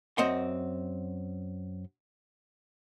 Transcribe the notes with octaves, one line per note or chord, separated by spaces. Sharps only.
F#2 C4 D#5 F#5 C6